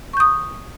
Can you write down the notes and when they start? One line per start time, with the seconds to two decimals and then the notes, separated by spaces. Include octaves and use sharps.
0.13 C#6
0.17 G6
0.20 D#6